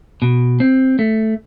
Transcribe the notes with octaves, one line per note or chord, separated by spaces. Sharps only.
B2
C4
A3